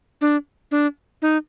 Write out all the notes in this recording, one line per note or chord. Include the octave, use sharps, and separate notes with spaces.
D4
D4
D#4